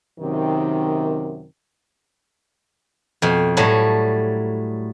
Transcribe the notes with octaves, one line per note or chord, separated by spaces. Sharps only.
F#2 C3 D#3
F2 B2
A2 F#3 G3 A4